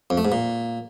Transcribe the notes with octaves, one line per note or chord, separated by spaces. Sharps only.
F2
A3
G#2
A#2